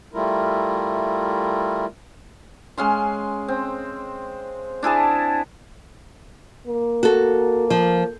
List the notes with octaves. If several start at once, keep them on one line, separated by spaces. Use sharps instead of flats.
G3 A3 E4 F4 A#4
G#3 C#4 F5 C6
C4
D4 E4 G#4 A5
A#3
F#4 A4
F3